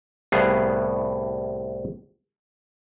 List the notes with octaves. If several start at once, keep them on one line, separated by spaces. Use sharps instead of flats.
C2 A2 G3 B3 G#4 F5